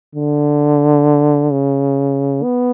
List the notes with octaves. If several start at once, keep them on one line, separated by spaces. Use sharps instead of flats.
D3
C#3
B3